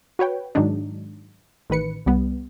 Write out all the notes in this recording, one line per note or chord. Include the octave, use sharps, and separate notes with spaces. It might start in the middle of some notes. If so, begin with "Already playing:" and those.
F#4 B4 C#5 G5
G#2 D#3 F#3 G#3 D4 D#4
A1 D#3 B4 C#7
C2 G3 B3